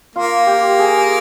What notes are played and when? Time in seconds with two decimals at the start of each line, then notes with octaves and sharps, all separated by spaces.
0.16 A#3 F4
0.47 G4
0.79 G#4